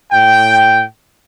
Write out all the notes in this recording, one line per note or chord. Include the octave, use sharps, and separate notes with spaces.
A2 G5